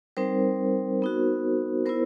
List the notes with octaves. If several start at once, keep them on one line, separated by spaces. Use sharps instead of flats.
G3 C4 D#4 A#4 C5
B3 D#4 F#4
B3 E4 A#4 C5